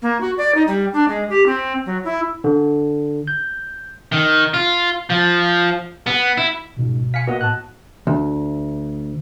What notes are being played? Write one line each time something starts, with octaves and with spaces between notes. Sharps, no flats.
A#3
F#4
D5
D#4
G3
D4
G#3
G4
C4
F#3
E4
D3
G6
D#3
F4
F3
B3
E4
G1 C#2 G#2 B2
F5 G#5 B6 C#7
A#3 B3 F#4 D#5
A2 A5 F#6
D2